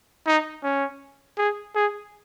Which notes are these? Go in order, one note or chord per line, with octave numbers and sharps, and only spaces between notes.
D#4
C#4
G#4
G#4